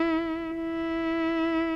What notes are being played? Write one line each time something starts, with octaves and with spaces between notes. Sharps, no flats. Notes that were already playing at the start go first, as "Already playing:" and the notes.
Already playing: E4
E4